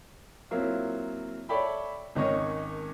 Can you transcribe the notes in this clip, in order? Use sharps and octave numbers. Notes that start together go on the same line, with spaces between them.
F#3 A#3 C4 E4 F4
A4 C#5 D5 E5 G5 B5
G#1 D#3 C#4 C#5 D#5